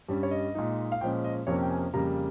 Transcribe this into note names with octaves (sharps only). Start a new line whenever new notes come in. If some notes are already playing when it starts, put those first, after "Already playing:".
G2 G3 C#4
C#5
D#5
A#2 G#3 D#4
F5
A#2 F3 G#3 C#4 G5
D#5
F2 C3 F3 A#3 C#4 C#5
G5
G#5
F2 C#3 G3 A#3 A#5